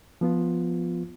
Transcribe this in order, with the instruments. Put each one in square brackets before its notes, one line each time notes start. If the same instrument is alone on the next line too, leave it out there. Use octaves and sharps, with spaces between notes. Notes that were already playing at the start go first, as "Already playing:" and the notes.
[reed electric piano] F3 B3 F4